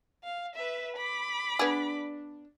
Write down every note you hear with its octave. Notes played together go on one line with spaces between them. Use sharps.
F5
B4 E5
B5 D6
B3 D4 G#4